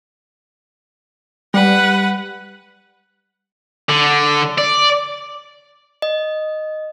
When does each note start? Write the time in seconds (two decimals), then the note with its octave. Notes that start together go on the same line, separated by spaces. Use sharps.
1.54 G3 B4 F#5
3.89 D3
4.58 D5
6.02 D#5